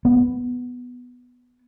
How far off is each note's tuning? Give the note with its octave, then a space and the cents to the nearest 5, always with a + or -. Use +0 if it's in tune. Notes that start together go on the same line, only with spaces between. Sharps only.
B3 +0